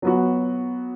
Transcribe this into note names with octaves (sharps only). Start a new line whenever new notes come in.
F#3 B3 F#4